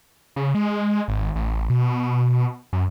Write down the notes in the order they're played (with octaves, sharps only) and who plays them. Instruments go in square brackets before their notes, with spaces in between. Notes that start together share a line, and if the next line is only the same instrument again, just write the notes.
[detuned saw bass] C#3
G#3
G#1
A1
B2
F#2